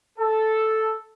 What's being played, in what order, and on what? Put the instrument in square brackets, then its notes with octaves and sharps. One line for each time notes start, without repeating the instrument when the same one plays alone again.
[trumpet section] A4